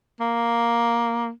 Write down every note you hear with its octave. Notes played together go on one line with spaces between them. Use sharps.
A#3